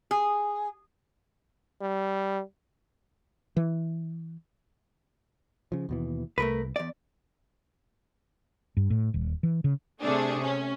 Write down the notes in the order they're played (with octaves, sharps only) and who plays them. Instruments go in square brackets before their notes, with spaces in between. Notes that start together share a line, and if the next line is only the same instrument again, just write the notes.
[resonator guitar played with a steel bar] G#4
[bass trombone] G3
[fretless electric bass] E3
[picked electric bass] C#3 F3
D#2 B2 E3
[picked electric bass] C2 [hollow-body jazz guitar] A3 A#4 B4
[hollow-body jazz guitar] E2 D5
[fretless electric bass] G2
A2
D#1
E3
C#3
[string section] C3 A3 D4 G#4
C#4